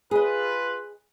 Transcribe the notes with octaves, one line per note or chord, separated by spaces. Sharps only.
F4 G#4 B4 D#5